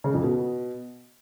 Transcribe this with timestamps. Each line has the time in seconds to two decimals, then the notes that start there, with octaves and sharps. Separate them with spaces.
0.04 C#3
0.14 F2
0.23 B2